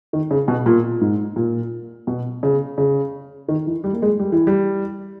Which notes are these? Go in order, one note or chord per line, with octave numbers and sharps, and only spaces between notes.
D#3
C#3
B2
A#2
G#2
A#2
B2
C#3
C#3
D#3
E3
G3
A#3
G#3
G3
E3
G3